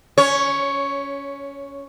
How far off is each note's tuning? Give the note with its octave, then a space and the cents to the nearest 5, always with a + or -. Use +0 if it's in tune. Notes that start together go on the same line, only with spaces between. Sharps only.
C#4 +20 C#5 +0